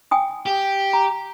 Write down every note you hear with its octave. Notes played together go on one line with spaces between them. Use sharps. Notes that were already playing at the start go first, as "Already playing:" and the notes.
G5 G#5 D#6
G4
A#5